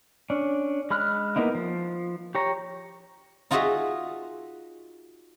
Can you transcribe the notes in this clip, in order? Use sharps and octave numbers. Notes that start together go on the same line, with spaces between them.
C#4 D4
G#3 B5 F6 F#6
A#3 B3 D#4 E4
F3
G4 C#5 A#5
D#4 F4 F#4 G#4 D#5 E5